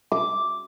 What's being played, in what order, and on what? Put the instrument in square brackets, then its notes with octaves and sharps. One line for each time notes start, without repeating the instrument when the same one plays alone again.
[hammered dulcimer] D6